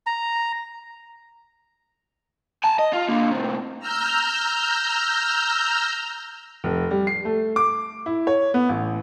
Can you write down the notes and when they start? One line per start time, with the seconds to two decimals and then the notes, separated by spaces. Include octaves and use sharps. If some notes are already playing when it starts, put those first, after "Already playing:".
0.07 A#5
2.64 G#5 A5
2.79 D#5
2.93 F4
3.09 D3 A#3
3.31 A2 C3
3.79 A#5 E6 F6 G6
6.64 F1
6.91 G3
7.07 C7
7.25 A3
7.56 D6
8.06 E4
8.27 C#5
8.54 B3
8.69 A1